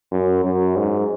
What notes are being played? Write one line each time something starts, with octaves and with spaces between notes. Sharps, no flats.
F#2
F#2
G#2